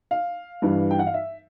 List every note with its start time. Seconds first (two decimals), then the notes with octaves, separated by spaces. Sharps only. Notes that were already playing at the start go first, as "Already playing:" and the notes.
0.11 F5
0.62 G2 E3 G3
0.91 G5
0.99 F#5
1.07 F5
1.14 E5